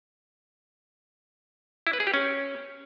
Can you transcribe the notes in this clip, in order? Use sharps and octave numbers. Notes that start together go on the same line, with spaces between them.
E4
B4
G#4
G4
C#4